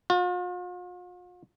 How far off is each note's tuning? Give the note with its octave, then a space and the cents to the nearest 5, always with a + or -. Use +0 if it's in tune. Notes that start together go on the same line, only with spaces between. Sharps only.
F4 +45